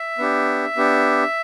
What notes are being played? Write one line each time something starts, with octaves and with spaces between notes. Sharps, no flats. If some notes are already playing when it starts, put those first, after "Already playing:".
Already playing: E5
B3 D4 G4
B3 D4 G4